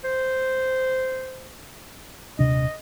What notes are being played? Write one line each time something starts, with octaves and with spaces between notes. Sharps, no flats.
C5
D#1 C3 D4 D#5